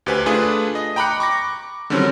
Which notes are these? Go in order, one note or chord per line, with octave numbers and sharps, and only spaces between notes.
D2 G4 B4 C5 G#5
A3 D4 F4 G#4 B4
D#5
G5 A#5 B5 D6 F#6 C#7
C#6 D6 A#6
D3 D#3 F#3 G3 C4 C#4